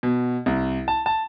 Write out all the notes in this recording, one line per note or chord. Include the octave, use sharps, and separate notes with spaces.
B2
C2
A5
A5